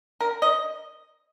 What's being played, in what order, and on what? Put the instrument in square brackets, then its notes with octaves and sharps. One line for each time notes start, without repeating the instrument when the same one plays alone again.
[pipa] A#4
D#5